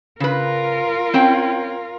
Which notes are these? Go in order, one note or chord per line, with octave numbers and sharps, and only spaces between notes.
C#3 F4 A#4 B4
C4 C#4 G5